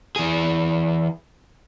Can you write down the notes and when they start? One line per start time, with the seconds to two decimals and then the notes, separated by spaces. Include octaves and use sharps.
0.16 E3 G#4